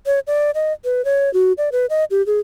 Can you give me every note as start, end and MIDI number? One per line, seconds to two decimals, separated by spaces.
0.06 0.20 73
0.27 0.51 74
0.55 0.73 75
0.85 1.04 71
1.05 1.32 73
1.34 1.53 66
1.58 1.69 74
1.72 1.86 71
1.90 2.04 75
2.11 2.24 67
2.26 2.40 68